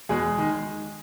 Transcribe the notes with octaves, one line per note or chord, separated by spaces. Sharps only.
E2 B2 G#3 G#4
D#3 G#3